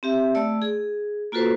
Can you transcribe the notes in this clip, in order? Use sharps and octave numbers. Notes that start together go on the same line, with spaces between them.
C4 G4 E5
A3 D5 A5 E6
G#4
A#3 F4 F#4 A4 B4 C5